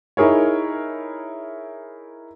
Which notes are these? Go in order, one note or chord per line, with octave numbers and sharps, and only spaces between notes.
D#4 E4 G#4 A#4 C#5